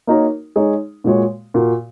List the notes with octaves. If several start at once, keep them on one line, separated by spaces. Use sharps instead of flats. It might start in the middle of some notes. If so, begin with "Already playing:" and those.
A#3 D#4 F#4 A#4 C#5
G#3 D#4 G#4 C#5
A#2 G#3 F#4 C#5
A#2 A#3 F#4